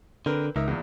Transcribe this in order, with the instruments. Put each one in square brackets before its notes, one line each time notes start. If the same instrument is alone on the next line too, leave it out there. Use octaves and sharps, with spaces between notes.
[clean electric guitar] D3 [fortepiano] C4 A#4 B4
[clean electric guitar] C#2 [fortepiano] D#4 A#4 E5
[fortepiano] E2 A#2